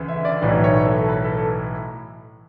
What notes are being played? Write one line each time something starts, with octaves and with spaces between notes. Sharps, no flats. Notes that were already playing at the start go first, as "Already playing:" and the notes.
Already playing: D2 C#3 E3
E5
D5
B1 A2 E3
C#5
A4
B4
A4